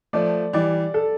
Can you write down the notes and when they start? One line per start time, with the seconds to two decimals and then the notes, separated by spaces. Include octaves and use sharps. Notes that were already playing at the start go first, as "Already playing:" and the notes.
0.13 F3 A3 D5
0.53 E3 G3 D5
0.94 A4